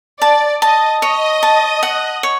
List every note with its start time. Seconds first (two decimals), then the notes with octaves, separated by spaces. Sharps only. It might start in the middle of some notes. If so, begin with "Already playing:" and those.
0.21 D5 A5
0.61 D#5 A5
1.02 C#5 D#5
1.43 A5
1.83 F#5
2.23 C#5